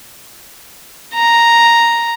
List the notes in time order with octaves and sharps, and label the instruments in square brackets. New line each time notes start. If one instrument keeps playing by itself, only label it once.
[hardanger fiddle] A#5